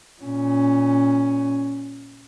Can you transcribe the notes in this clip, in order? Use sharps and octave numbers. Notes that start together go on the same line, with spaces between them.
A#2 C#4